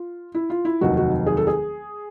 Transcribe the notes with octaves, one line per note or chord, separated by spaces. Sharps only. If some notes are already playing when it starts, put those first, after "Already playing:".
Already playing: F4
E4
F4
E4
F1 D#2 D#3 F#3 F#4
F#4
G#4
A4
G#4